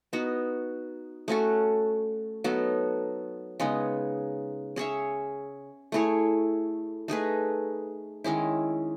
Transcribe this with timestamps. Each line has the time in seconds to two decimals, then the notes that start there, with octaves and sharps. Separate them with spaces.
0.13 B3 D#4 F#4
1.28 A3 C#4 F#4 A4
2.44 F#3 B3 D#4 A4
3.60 C#3 G#3 B3 D#4
4.76 C#4 G#4 C#5 E5
5.92 A3 E4 G#4 C#5
7.08 A3 D#4 G#4 B4
8.24 D#3 G#3 C#4 E4